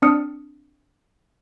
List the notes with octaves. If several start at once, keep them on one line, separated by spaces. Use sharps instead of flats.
C4 D4 D5 D#6 F6 C#7